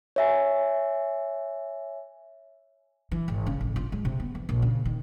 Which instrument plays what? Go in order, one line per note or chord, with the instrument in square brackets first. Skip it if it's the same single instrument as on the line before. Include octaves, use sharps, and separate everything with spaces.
[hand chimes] C#5 E5 G#5
[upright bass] E3
G#1
C#3
A1
F4
G#3
C3
B3
E3
A#1
C#3
D#3